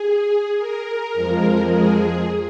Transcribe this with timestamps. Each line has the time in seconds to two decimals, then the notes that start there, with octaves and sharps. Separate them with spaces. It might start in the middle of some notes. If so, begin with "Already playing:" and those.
Already playing: G#4
0.58 A#4
1.14 F2 F3 G#3
1.69 G#4